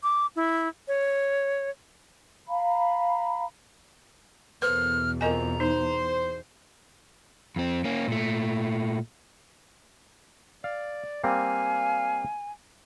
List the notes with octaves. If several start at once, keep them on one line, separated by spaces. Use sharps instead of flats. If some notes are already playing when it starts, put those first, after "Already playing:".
D6
E4
C#5
F5 A#5 B5
E2 B2 A#3 A4 B4 C5 F6
F2 A#4 D#5 G#5 A#5
D#4 C5
F2 C4
A#3 C#4
A#2 A3
D5 F5
G3 A#3 C4 F5 G#5